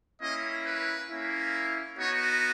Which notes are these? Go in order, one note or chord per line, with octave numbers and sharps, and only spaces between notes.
A#3 C#4 E4 D#5
B4
A#3 C#4 E4
B3 D#4 F#4 C#5